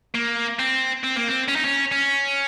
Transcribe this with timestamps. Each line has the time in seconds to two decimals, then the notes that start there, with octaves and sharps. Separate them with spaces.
0.15 A#3
0.59 C4
1.04 C4
1.16 A#3
1.27 C4
1.48 C#4
1.56 D#4
1.65 C#4
1.92 C#4